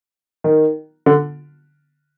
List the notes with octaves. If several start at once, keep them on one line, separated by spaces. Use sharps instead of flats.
D#3
D3